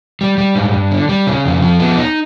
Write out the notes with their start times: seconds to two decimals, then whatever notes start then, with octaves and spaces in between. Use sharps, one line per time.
0.21 G3
0.38 G3
0.55 G#2
0.74 G2
0.91 D3
1.09 G3
1.27 C#3
1.45 F2
1.62 F3
1.79 B3
1.97 D#4